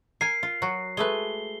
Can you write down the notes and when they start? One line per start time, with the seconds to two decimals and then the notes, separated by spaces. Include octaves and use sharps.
0.21 A#4 G#5 C7
0.43 F4
0.62 F#3 F#4
0.97 G#3 A3 B4 G7